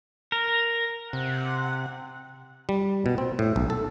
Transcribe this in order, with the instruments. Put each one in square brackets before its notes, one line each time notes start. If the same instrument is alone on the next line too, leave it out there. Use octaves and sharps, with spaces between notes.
[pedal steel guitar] A#4
[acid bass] C3 [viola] F#5
[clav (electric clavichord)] G3
B2
C4
A2
B1
A4